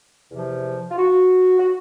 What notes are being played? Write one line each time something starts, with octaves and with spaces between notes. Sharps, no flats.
E2 C3 F3
F4
F#4
F#4